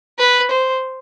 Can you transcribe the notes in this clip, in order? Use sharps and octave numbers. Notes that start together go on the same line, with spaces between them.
B4
C5